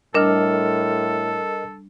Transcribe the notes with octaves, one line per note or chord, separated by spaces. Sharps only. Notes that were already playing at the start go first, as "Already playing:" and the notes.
A2 G3 D4 A4 A#4 D#5 F6